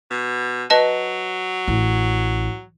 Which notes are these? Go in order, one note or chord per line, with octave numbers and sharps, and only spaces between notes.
B2
F#3 B4 D#5 A5
A1